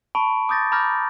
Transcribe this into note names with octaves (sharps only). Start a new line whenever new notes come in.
A5 B5 C#6 D7
D6 D#6 G6 A6 A#6
A#5 B5 D6 F6 G6 A#6